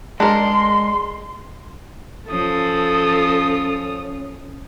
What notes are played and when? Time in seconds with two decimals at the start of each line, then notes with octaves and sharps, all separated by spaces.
0.20 G#3 D4 A#4 D5 C6
2.31 F3 C#4 A4 D#6